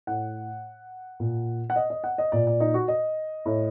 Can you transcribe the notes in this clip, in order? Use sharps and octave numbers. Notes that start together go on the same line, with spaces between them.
A2 F#5
A#2
F#5
D#5
D#5
F#5
D#5
A#2 D5
D5
D#4
F#4
D#5
A2